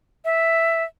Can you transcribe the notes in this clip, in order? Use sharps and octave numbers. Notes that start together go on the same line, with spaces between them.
E5